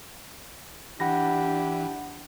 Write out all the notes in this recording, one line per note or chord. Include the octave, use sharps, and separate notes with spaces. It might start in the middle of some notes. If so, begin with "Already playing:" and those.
E3 D4 G4 F#5 B5 A#6